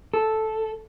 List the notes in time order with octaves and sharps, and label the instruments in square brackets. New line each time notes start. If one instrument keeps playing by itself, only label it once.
[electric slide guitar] A4